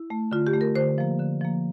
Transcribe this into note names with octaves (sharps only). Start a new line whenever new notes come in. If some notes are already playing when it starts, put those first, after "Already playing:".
Already playing: E4
A3
D3 F4
G4
A3
A#4
D3 C5
F3 A#3
D3
F3 A#3